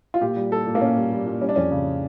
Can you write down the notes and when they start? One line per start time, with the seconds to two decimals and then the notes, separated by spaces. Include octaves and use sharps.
0.14 F4
0.21 A#2 G4
0.36 G3
0.51 G3 A4
0.67 A#2
0.75 A#3
0.81 A#2 C#4
0.97 G3
1.12 G3
1.27 A#2
1.41 G3 C#4
1.49 D4
1.56 F2 C#4
1.72 C#3